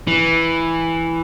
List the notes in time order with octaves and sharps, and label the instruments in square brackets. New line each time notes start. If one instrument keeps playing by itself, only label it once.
[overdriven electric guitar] E3